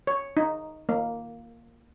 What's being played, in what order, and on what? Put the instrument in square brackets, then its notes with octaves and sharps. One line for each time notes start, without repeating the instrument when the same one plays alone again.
[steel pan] C#5
D#4
A#3